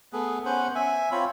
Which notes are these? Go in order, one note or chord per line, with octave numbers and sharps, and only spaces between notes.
A3 B3 G#4
B3 C#4 C5 F#5
E5 G#5
C4 F4 C#5 B5